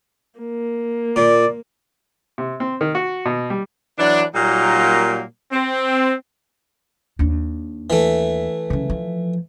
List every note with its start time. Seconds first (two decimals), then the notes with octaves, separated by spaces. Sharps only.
0.39 A#3
1.16 A#2 D5
2.38 C3
2.60 C4
2.81 D#3
2.95 F#4
3.26 B2
3.50 G3
3.98 E3 F#3 D4
4.34 A#2 F#3 G3 A#3 D#4
5.52 C4
7.19 D#2 D4
7.90 E3 A3
8.70 C#3 F#3
8.90 F3